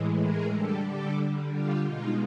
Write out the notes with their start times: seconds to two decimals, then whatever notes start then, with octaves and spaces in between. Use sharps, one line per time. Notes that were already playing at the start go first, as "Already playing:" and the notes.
Already playing: A2 E3 G#3
0.20 G#4 A#4
0.54 D3 G3 G4 A4
0.87 G4 A4
1.53 F4 G4
1.86 B2 G#3 D#4 F4